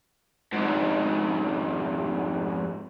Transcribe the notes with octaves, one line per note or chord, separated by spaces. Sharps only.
F2 G#2